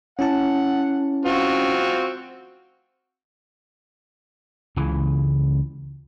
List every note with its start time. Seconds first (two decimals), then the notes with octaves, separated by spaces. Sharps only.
0.19 C#4 E4 F#5 A5
1.25 C4 F4 F#4
4.76 C#2 C#3 E3